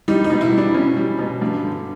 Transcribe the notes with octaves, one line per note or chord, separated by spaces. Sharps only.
G3 D#4
D#4
B2
E4
G3
D4
B2 C#4
G3
B2
G2
D3